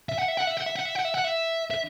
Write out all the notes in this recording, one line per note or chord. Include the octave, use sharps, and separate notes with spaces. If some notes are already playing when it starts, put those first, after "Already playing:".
E5
F#5
E5
F#5
E5
F#5
E5
F#5
E5
F#5
E5
F#5
E5
E5